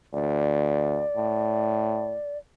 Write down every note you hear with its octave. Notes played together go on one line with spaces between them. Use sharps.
D2 D5
A2